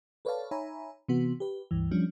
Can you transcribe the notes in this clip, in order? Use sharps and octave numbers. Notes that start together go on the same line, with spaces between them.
A4 B4 C#5 D5 F5 A5
D#4 C#5 E5 G#5 A#5 B5
C3 E3 B3 F#4
G4 B4
C#2 G2 E3
F3 G3 C#4 D4